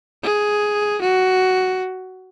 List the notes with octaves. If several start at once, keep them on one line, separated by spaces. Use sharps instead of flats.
G#4
F#4